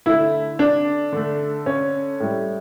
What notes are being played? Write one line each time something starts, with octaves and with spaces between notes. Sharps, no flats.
D3 A3 E4
D4
D3 A3
C#4
A2 G3